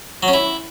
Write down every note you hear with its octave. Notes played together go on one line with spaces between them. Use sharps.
F#3
C#4
E4